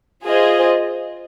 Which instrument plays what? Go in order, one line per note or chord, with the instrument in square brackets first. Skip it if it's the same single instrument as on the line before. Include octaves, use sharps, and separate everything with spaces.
[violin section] F4 G#4 C5 D#5